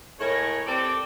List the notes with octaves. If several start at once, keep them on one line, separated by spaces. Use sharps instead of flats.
A2 G#3 A#4 C#5
C4 G4 A4 D5